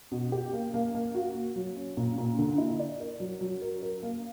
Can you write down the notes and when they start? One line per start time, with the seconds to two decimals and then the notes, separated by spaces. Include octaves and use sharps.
0.12 B2
0.32 G4
0.53 A#3
0.74 A#3
0.95 A#3
1.15 F#4
1.35 A#3
1.56 F#3
1.77 C#4
1.97 A#2
2.18 A#2
2.39 D3
2.58 E4
2.79 D5
3.00 A#4
3.20 F#3
3.41 F#3
3.62 A#4
3.82 A#4
4.03 A#3